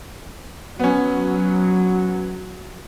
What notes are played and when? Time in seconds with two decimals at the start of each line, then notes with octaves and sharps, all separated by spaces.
0.79 F#3 B3 C#4